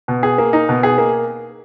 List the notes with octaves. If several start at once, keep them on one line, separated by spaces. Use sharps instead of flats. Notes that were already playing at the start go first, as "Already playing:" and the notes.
B2
G#4
A#3
D#4
B2
G#4
A#3